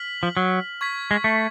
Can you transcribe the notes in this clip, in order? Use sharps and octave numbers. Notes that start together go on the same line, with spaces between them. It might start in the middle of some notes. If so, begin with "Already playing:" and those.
Already playing: F6 B6 F#7
F3
F#3
C#6 G#6 B6
G#3
A3